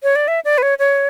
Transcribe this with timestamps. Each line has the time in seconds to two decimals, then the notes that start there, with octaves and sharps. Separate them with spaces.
0.03 C#5
0.16 D5
0.28 E5
0.45 D5
0.58 B4
0.62 C#5
0.79 C#5